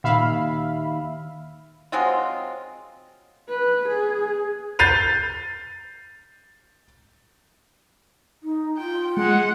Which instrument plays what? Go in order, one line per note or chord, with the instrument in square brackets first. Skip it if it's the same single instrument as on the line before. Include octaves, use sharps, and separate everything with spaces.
[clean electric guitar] D#2 [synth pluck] A#2 [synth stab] E5 F5 B5
[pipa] F#3 G#3 C4 F4
[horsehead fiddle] B4
G#4
[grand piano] G6 A6 C7 D#7 F7
[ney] D#4
[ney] F4 [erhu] G5
[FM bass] G#3 [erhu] F#5